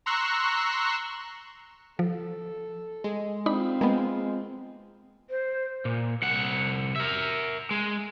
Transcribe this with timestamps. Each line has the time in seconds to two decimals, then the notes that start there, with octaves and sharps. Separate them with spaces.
0.06 A#5 C6 C#6 E6 F#6
1.99 F3 A4
3.04 G#3
3.46 C4 D4 D#4 F4 B5
3.81 G#3 A#3 B3
5.30 C5
5.85 A#2
6.22 C2 F#5
6.96 A#4 E5
7.71 G#3